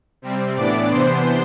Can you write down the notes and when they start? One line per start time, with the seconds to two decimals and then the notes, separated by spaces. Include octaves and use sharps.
0.22 C3 G3 C4
0.56 A2 E3 B3 D4 D5 D6
0.90 C3 E3 B3 D4 C5 C6